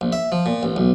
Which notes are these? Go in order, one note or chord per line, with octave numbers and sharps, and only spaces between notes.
A#1
E5
F3
A#2
A1
B1